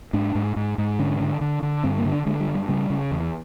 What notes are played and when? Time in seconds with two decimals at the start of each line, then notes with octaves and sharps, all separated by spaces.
0.13 G#2 D4
0.35 G#2
0.56 G#2
0.78 G#2
0.99 D3 C#4
1.20 D3
1.41 D3
1.62 D3
1.84 G2 C4
1.98 A#3
2.05 D3
2.12 D4
2.26 D3 G#3
2.40 G3
2.48 G2
2.55 G3
2.69 C#3 G3
2.90 C#3
3.11 E2